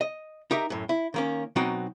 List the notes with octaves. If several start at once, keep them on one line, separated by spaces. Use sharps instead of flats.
D#5
D#4 G4 A#4 E5
F#2 A2
E4
D#3 A#3 C#4
B2 F#3 C4 D#4 F#4 G5